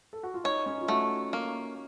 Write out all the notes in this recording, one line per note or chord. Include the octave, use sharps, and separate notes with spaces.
A4
F#4
F4
D#4 C#5
C#4
D#4
F4
A3 F#4
A#3